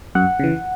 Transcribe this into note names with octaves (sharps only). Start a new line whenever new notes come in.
F#2 F#5
C#3 E3